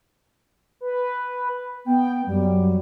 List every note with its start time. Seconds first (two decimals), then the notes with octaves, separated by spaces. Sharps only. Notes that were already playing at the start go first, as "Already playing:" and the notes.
0.81 B4
1.86 B3 G5
2.26 F#2 G3